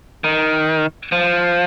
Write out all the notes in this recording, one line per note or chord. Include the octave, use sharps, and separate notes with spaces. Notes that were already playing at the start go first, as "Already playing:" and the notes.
D#3
F3